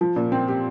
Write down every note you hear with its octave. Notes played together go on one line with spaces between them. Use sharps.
F3
A#2
C4
G4